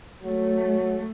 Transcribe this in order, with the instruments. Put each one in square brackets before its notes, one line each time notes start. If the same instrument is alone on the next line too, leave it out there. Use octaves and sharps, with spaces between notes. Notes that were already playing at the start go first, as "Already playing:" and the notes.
[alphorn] F#3 [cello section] A3